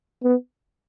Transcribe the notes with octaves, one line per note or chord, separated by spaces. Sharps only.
B3